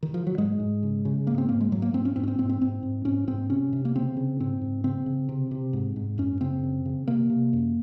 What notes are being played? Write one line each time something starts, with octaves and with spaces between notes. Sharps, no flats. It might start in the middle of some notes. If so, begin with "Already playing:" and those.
D#3
F3
F#3
G#2 G#3
G#2
C#3
C#3
G#2 A#3
C4
G#2 A#3
G#3
G#2 F#3
A#3
G#2 C4
C#4
G#2 C4
C#4
C4
G#2 C4
C4
G#2 C4
G#2
G#2 C#4
G#2 C4
C3 C#4
C3
A#3
C#3 C4
C#3
G#2 C4
G#2
C#3 C4
C#3
C3
C3
G#2
G#2
F#2 C#4
C#3 C4
F#2
C#3
C3 A#3
C3
F#2